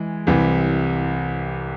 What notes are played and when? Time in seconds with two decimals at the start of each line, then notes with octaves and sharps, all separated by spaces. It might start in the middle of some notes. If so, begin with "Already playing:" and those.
Already playing: E3 G#3
0.27 C2 C3 E3